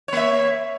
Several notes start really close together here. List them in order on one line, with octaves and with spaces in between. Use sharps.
C#5 A#3 E5